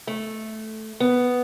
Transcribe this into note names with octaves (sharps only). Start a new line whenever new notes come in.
A3
B3